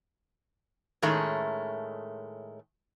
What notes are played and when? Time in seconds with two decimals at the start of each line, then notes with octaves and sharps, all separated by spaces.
1.02 A2 D#3 G#3 A3 C#4